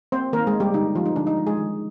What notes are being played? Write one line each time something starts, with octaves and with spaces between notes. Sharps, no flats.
A#3 C4 C5
D#3 A#3 A#4
G#3 G#4
A#3
G3 G4
D3 D#4
F3 G#3 F4
D#4
D3 D4
D#4
F3 G#3
G#3 G#4
D#3